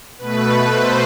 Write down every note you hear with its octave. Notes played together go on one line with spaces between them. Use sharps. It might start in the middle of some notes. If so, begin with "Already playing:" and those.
B2 A3 B4
C5